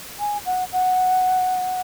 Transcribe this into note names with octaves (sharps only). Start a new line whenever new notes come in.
G#5
F#5
F#5